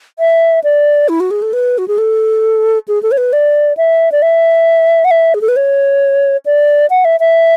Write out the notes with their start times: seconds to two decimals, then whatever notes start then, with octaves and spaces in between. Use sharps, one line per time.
0.19 E5
0.64 D5
1.09 E4
1.20 F#4
1.31 G#4
1.42 A4
1.53 B4
1.78 F#4
1.88 G#4
1.98 A4
2.88 G#4
3.03 A4
3.12 C#5
3.18 B4
3.33 D5
3.77 E5
4.12 D5
4.22 E5
5.05 F#5
5.11 E5
5.34 G#4
5.41 A4
5.48 B4
5.56 C#5
6.46 D5
6.90 F#5
7.05 E5
7.20 E5